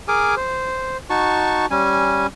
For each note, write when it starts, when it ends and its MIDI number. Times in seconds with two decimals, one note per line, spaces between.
0.08 0.35 68
0.08 0.35 70
0.08 0.35 80
0.08 0.35 86
0.36 0.97 72
1.10 1.66 63
1.10 1.66 66
1.10 1.66 81
1.10 1.66 85
1.71 2.27 55
1.71 2.27 61
1.71 2.27 80